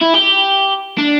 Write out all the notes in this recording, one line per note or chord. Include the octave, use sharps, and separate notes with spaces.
E4
G4
D4